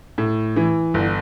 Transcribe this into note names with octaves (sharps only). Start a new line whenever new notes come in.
A2
E3
G1